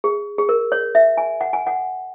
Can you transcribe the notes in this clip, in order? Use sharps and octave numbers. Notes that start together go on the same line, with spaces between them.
G#4
G#4
A#4
C#5
E5
G#5
F#5
G#5
F#5